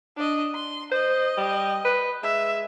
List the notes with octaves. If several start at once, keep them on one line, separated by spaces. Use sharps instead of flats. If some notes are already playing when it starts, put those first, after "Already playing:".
D4 D#5
C6
C5 D#5
G3
B4
G#3 E5